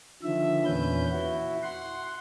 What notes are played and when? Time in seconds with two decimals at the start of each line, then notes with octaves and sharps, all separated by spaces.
0.23 D3 D#3 F3 E5
0.65 E2 A#2 C#4 B4 G6
1.12 E4 F#4
1.63 F#5 C6